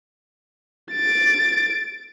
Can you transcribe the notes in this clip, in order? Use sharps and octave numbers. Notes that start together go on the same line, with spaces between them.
A6 D7